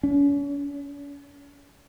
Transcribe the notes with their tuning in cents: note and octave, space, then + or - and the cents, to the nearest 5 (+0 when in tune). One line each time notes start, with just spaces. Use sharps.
C#4 +40